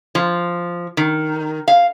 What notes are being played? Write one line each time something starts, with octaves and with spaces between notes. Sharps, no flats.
F3
D#3
F5